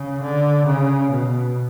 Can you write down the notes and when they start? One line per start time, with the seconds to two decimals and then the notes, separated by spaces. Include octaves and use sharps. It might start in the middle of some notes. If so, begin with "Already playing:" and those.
Already playing: C#3
0.22 D3
0.66 C#3
1.11 B2